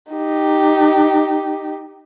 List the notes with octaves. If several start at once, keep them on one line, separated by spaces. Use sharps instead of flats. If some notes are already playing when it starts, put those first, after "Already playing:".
D#4 G4